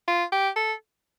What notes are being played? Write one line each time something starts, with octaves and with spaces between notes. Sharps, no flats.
F4
G4
A4